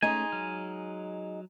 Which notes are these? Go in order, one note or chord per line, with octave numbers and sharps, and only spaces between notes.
G#3 A3 C#4 D#4 G#5
F#3 F6